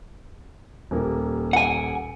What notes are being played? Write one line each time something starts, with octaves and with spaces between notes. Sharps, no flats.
D#1 A#3 G4
F#5 G#5